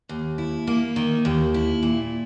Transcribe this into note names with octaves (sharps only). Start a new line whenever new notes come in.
D#2
E4
A#3
D#3
D#2
E4
A#2